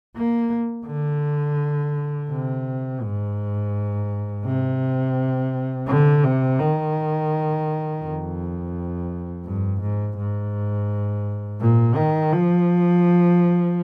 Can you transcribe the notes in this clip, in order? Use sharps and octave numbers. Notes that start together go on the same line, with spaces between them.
A#3
D3
C3
G#2
C3
D3
C3
D#3
F2
G2
G#2
G#2
A#2
D#3
F3